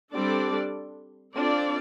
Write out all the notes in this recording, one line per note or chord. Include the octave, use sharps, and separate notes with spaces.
G3 C4 D4 A4 D5
C4 D4 F4 A4 D5